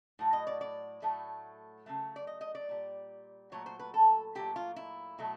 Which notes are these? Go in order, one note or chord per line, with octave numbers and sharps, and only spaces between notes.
A2 F#3 A3
D#5
D5
D5
A2 F#3 A3
C#3 F#3 A3
D5
D#5
D#5
D5
A#2 G3
A#2 F#3 A3 C#5
C5
B4
A4
A#2 F#3 A3 G4
F4
E4
B2 F#3 A3